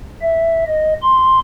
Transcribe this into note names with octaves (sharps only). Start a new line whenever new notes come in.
E5
D#5
C6